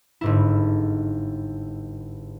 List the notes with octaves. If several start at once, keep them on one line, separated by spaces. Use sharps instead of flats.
G1 G#2 E4